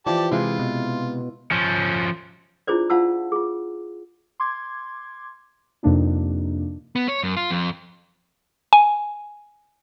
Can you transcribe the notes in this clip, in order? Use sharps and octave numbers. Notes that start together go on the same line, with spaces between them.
E3 F3 G4 D5 A5
C3 G#3 E4 F4
B2
F3 C#4
D4 E4 F4 G#4 C5 D5
F4 C5 F5 F#5 A5 E6
F4 G#4
C6 D6 G#6
F2 C3 A#3 D4 D#4
B3
C#5
F#2
F4
F2
G#5